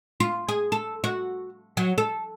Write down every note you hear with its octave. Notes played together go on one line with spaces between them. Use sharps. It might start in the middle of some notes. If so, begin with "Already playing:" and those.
F4
G#4
A4
F#4
F#3
A4